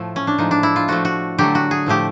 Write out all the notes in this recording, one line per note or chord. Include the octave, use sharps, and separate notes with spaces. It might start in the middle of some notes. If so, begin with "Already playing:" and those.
Already playing: A2 F3 A3
C#4
D4
A2 F3 G#3 D#4
D4
E4
F4
A2 F3 A3 F#4
F#4
D3 F#3 A3 G4
F#4
G#4
A2 F3 A3 G4